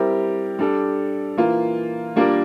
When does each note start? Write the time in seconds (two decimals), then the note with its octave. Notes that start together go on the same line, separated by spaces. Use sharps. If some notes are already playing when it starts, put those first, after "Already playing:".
Already playing: G3 C4 E4 G4 A#4
0.59 G3 D4 A4
1.37 E3 A#3 F4
2.16 G3 A#3 D4 F4 A#4